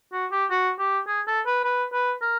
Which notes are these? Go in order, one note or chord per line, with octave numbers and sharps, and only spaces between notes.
F#4
G4
F#4
G4
G#4
A4
B4
B4
B4
A#4